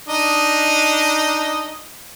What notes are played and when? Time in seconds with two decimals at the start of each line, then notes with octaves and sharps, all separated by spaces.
0.08 D4 D#4 D#5